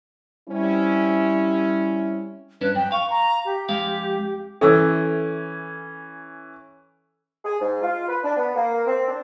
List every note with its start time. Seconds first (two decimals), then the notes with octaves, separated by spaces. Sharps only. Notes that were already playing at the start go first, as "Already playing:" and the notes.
0.49 G3 C4 C#4 E4
2.61 G2 C#4 D4 B4
2.75 F#2 G5
2.92 F5 C#6
3.10 A#5
3.45 G4
3.69 F2 G#3 F5
4.61 E3 C#4 A4 E5 E6
7.45 G#4
7.61 G#2
7.82 F4
8.09 B4
8.24 D4
8.37 B3
8.56 A#3
8.87 C4
9.08 D4